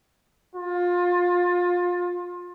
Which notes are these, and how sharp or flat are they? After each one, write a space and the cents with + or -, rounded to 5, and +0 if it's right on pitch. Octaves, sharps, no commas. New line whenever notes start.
F4 +25